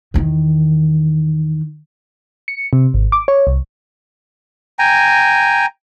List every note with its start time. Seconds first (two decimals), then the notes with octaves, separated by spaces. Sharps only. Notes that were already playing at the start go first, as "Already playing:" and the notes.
0.14 E2 D#3
2.48 C#7
2.73 C3
2.94 G#1
3.12 D6
3.28 C#5
3.47 C2
4.79 G5 G#5 A#5